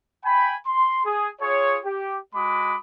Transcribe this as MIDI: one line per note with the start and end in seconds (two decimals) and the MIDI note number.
0.25 0.56 79
0.25 0.56 80
0.25 0.56 83
0.66 1.01 84
1.05 1.29 68
1.41 1.78 65
1.41 1.78 68
1.41 1.78 73
1.84 2.16 67
2.35 2.76 56
2.35 2.76 66
2.35 2.76 83
2.35 2.76 86
2.35 2.76 87